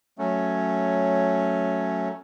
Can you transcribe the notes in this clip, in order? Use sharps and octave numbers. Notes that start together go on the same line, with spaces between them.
F#3 A3 C#4